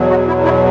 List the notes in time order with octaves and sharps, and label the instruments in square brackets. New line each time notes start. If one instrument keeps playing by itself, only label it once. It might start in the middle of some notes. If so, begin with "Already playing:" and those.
Already playing: [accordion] E2 B2 F#3
F#4
E4
E4